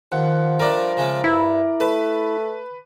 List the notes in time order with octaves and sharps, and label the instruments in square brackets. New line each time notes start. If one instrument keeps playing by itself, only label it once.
[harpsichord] D#2 [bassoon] F3 [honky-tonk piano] F#5
[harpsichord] G3 A3 D4 [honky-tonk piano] A#4 D5
[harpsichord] C#3 G#3 A3
[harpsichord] G2 [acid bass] E4
[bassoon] A3 [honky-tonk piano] B4 [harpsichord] A5